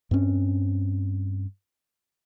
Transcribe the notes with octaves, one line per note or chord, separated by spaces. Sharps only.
G2 C4 C#4